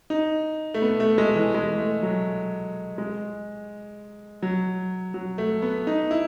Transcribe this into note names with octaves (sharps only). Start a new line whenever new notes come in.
D#4
A3
B3
A3
G#3
E3
G#3
A3
F#3
G#3
F#3
F#3
A3
B3
D#4
E4